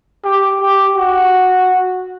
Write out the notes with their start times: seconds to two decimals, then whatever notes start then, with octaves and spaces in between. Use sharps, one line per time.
0.24 G4
0.61 G4
0.96 F#4